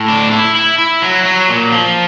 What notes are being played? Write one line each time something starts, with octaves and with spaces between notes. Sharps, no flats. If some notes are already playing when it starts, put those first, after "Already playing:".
Already playing: A2
D4
E4
E4
E4
F#3
F#3
A#2
F3